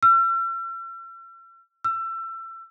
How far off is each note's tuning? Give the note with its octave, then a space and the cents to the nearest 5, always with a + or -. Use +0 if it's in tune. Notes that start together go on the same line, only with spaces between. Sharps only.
E6 +45
E6 +30